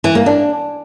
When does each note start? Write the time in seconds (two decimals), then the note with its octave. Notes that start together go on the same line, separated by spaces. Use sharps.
0.04 E3
0.15 A#3
0.26 D4